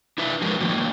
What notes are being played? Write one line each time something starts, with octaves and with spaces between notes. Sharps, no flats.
D4 E4 B4 E5
F3 G#3 F#4 A#4 B4
D#3 F3 A3 A#3